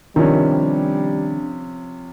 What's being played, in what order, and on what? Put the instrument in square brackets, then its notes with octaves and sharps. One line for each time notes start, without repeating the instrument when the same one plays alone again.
[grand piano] C3 F3 C#4 [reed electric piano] D#3 [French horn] G3 [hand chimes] D4